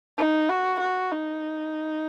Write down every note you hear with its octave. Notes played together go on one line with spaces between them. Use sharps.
D#4
F#4
F#4
D#4